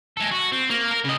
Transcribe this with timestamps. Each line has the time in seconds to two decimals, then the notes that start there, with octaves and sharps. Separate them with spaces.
0.17 G#3 A4
0.31 F#4
0.52 C4
0.70 A#3
0.92 A#4
1.05 C#3 D#5